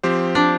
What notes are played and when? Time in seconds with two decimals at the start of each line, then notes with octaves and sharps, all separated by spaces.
0.03 F3 C4 G4 C5
0.35 D4